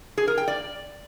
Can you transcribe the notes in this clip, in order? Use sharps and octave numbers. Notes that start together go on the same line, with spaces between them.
G#4
A#4
G5
D5